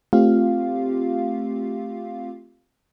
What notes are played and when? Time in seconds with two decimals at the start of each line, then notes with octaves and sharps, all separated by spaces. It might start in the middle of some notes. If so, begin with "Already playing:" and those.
0.13 A3 C4 F4 G4 F5